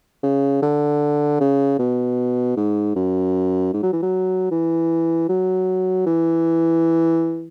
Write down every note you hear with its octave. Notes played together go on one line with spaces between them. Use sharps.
C#3
D3
C#3
B2
G#2
F#2
G#2
F#3
E3
F#3
E3
F#3
E3